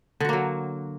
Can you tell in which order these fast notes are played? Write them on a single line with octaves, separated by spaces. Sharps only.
D3 F#4 A#3 F#3